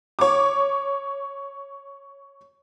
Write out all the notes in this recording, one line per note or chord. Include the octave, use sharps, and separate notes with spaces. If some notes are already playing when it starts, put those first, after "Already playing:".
C#5 D6